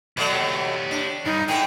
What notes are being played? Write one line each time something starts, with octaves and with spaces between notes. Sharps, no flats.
E2 B2 F#3 A3 D5
G4 C#5
D4
G2 D#4
A2 B3 G#4 G5